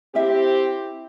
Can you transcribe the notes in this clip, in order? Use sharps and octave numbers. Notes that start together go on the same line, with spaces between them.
C4 E4 G4 E5